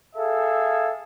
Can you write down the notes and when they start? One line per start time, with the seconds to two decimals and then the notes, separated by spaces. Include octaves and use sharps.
0.15 G#4 A4 E5 F5